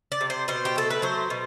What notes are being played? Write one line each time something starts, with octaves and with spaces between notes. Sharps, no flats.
D5
C3
C5
B2 C5
G4
A3 A4
B4
F#3 C5
B2